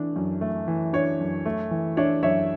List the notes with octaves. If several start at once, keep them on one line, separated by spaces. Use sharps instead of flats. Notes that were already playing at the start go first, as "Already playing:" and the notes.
Already playing: E3 A3 D4
F#2
A3
E3
D4 C#5
F#2
A3
E3
D4 C#5 E5
F#2 C#5 E5